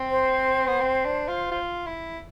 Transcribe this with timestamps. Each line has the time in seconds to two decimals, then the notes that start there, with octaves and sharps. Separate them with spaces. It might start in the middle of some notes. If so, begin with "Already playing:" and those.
Already playing: C4
0.10 C5
0.67 B3
0.80 C4
1.05 D4
1.28 F4
1.52 F4
1.87 E4